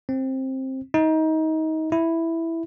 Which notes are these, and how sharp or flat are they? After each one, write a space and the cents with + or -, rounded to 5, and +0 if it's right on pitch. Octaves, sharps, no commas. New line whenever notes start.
C4 +15
D#4 +25
E4 +0